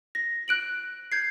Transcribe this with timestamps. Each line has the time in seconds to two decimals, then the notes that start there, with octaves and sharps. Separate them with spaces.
0.15 A#6
0.48 F#6 D7 F#7
1.12 G6 G#6 C7